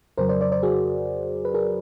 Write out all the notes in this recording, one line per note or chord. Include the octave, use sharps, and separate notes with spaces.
F2 C#3 F#3 A#4 C5
C5 D5
C5 D5
C5 D5
F#4 G#4
B4
G#4 A#4